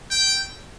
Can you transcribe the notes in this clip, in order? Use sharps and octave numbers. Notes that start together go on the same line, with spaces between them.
G5